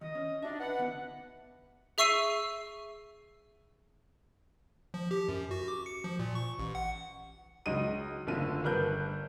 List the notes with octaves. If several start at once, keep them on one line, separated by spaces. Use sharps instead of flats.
D#3 D#5
C#4
D4 D#4 F#4 E5
B4 F#5
D3 B3
G#4 E5 C#6 E6 C7 D#7
F3
G4
F#2
F#4
D6
C#7
F3
A#2
C#6
A1
F#5
C#2 F#3 D#4 D#5 D#7
F#1 D3 A3 F4 D#7
G1 A#4 B4 F#6 G6